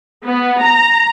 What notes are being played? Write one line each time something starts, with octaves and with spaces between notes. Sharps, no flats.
B3
A#5